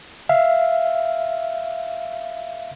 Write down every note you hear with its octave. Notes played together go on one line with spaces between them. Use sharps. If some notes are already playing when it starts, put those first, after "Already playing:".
E5 F5